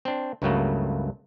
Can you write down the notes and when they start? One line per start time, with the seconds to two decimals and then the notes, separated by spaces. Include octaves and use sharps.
0.05 C4 D4
0.42 C#2 G2 C#3 F#3 A3 A#3